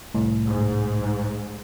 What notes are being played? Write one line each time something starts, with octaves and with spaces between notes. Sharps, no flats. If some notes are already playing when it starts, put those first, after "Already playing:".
C2 A2
G#2